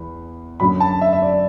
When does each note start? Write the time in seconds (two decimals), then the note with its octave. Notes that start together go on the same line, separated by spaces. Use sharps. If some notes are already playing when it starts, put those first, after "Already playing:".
Already playing: E2 B5
0.60 F#2 D3 F#3 B5
0.80 A5
1.01 E5
1.13 E5
1.22 D5